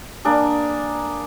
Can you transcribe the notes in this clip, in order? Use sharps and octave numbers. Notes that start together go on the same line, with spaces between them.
A#3 D4 G#4